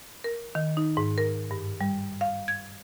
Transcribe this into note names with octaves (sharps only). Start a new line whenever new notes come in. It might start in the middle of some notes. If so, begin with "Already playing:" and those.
A#4
D#3
D#4
G#2
A#4
G2
G3
F5
G#6